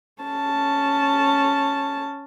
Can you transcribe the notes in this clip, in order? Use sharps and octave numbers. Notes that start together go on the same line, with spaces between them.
C#4 A5